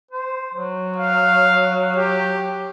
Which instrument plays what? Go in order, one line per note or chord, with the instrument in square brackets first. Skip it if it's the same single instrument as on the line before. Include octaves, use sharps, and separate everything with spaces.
[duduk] C5
F#3
[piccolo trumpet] F5
G4